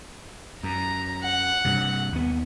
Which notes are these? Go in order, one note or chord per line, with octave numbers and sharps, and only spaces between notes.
F#2 A#5
F#5
G2 C3
D#2 B3